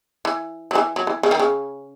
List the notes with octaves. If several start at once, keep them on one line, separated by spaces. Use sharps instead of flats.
E3
F#3
E3
F#3
E3
C#3
D#3
C#3